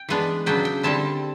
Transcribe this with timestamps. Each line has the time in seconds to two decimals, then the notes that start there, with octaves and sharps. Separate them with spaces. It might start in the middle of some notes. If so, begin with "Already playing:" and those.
Already playing: G5
0.09 E3 G#3 B3 D4
0.46 C#3 F#3 B3 D4 G5
0.65 G5
0.83 D3 G3 C4 E4 A5